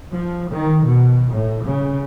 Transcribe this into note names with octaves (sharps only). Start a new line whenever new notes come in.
F3
D#3
B2
A2
C#3